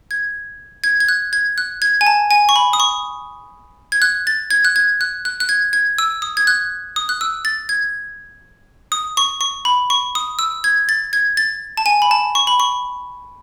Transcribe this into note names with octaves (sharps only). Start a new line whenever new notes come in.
G#6
G#6
G#6
F#6
G#6
F#6
G#6
G#5
A5
G#5
C#6
B5
D#6
C#6
G#6
F#6
A6
G#6
F#6
G#6
F#6
F#6
F#6
G#6
G#6
E6
D#6
G#6
F#6
D#6
F#6
E6
A6
G#6
D#6
C#6
C#6
B5
C#6
D#6
E6
G#6
A6
G#6
A6
A5
G#5
B5
A5
C#6
B5
C#6